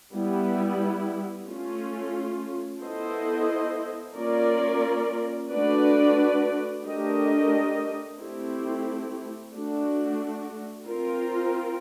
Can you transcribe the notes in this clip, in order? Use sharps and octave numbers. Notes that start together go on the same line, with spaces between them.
G3 B3 E4
A3 C#4 F4
B3 E4 A4 C5 D#5
A#3 C#4 F4 A#4 D5
A3 D4 F#4 B4 D5
A3 D4 G4 A#4 D#5
A3 C4 E4 G4
A3 D4 F#4
C4 F4 A#4